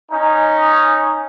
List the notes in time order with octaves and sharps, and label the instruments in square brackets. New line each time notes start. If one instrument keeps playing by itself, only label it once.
[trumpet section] C#4 D#4